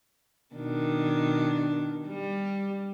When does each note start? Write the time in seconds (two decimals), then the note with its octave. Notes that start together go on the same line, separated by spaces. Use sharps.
0.54 B2 D#3 D4
2.08 G3